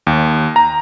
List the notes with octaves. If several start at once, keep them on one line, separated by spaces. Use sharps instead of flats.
D#2
A#5